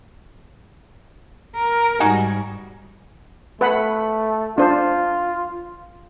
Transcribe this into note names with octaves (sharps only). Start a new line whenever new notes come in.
A#4
G#2 G3 D#4 F#4 G#4
A3 B4 F#5 B5
D4 F4 C5